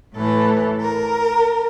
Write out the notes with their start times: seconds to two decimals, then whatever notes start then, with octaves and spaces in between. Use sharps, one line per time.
0.15 A2 E3 A4
0.79 A#4